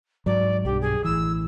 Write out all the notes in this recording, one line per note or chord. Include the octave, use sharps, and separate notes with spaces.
G#2 F#3 D5
B1 G2 G4
G#4
A1 E3 E6